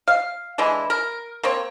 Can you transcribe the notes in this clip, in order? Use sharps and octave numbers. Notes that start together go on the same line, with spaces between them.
F5
D3 E3 G#3 E4
A#4
A#3 C4 C#5